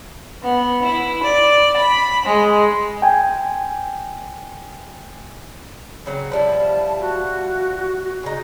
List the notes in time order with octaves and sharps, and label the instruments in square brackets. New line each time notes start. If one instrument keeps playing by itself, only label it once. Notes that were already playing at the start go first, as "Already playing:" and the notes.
[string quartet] B3
E4
D5
B5
G#3
[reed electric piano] G5 G#5
[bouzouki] C#3 F#3 C4
[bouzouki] F3 G3 E4 [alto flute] A5
[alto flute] F#4
[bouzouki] C#3 D#4